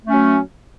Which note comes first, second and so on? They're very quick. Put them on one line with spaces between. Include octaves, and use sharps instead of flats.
A3 C#4 F#3